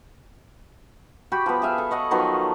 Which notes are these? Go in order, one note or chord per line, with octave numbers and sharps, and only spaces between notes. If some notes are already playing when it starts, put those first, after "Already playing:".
F#4 G4 G5 B5
F3 B3
G#4 E5 F5
A4
C#5 D#5 F#5
D#3 F3 F#3 B3